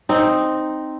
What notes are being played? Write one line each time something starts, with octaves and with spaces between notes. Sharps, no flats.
C4 D#4